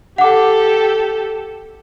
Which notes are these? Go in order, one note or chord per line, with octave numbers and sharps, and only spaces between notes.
G4 A4 F#5 D6